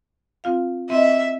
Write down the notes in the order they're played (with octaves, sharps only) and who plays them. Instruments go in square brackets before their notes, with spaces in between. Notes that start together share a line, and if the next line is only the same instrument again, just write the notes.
[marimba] C4 F4 F5
[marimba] C4 E4 D#5 [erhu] E5